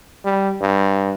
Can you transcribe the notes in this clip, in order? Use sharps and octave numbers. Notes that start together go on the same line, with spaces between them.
G3
G2